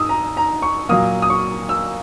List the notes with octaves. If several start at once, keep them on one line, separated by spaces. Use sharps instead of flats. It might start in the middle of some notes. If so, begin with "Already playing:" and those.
Already playing: G#2 D#6 E6
A#5
A#5
C#6
A#2 F#3 A#3 D#6
D#6
C#6
E6